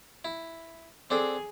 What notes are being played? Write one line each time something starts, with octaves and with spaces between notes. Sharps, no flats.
E4
C4 D4 G#4 A4